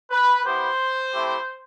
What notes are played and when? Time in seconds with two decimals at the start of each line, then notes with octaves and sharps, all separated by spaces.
0.11 B4
0.45 B3 E4 G4 C5
1.12 A3 C4 E4 G4